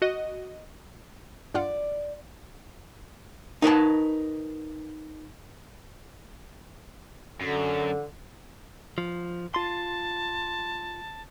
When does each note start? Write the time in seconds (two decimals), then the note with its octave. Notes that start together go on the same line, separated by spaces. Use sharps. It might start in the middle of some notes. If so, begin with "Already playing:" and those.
0.02 F#4 D#5
1.54 G2 F4 D5 F#5
3.62 D#4 A#4 B4 A5
7.41 F#2 D3
8.98 F3
9.54 F4 A5 C6